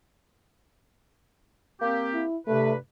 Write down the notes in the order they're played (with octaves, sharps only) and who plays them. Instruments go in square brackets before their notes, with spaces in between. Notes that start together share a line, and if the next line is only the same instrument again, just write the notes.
[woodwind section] A#3 C4 G4
[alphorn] E4
[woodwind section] G2 C3 B4 [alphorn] A3